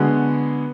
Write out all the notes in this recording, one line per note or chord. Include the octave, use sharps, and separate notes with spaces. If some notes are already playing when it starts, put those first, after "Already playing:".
Already playing: D3 G#3 B3 F#4